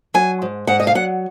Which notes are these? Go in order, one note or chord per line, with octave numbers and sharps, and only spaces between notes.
F#3 G#5
G#2
G#2 F#5
D#5
F5
F#3 F#5